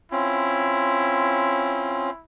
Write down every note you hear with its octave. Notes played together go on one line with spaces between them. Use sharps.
C4 C#4 E4 F4